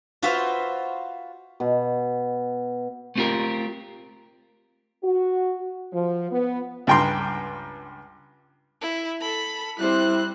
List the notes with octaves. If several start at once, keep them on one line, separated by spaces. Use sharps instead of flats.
F4 F#4 B4 C5 E5 F5
B2
A3 B3 C4 F4 G4 A#4
F#4
F3
B3
C#2 G2 G5 A#5 C6
E4
A4 B5
G3 C4 E4 C5 F#6